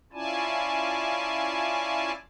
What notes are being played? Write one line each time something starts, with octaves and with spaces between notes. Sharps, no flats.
C#4 E4 F4 D5 G#5 A5